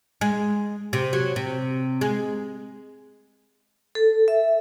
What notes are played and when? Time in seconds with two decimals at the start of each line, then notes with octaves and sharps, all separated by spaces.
0.21 G#3
0.93 C3
1.13 F#3
1.36 C3
2.01 G#3
3.95 A4
4.28 E5